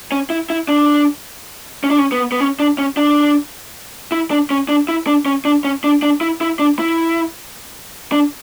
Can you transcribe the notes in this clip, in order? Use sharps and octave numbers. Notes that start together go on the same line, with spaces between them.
C#4
E4
E4
D4
C#4
D4
C#4
B3
B3
C#4
D4
C#4
D4
E4
D4
C#4
D4
E4
D4
C#4
D4
C#4
D4
D4
E4
E4
D4
E4
D4